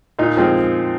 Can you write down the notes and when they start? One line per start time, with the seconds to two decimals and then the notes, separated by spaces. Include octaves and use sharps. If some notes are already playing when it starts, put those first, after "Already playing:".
0.19 A#2 D#4
0.37 F3 G#3 C4